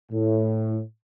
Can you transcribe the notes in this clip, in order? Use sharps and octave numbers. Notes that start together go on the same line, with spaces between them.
A2